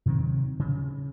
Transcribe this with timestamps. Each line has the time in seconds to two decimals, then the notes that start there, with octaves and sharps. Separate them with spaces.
0.06 C3 D#3 F#3 C4
0.59 C#3